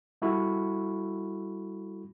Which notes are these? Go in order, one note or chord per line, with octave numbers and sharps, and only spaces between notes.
G3 E4 F#4 A4 B5 C#6